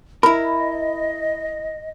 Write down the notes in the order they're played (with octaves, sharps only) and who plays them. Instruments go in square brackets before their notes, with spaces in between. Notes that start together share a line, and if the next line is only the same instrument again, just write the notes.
[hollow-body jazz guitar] E4 A#4 [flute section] D#5 [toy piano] B5